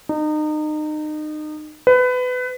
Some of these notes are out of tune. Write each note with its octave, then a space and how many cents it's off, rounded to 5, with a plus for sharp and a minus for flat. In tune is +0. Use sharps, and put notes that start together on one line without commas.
D#4 -30
B4 +25